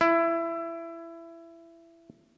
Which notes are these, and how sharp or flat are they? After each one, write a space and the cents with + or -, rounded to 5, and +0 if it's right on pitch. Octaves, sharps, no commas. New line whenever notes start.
E4 +20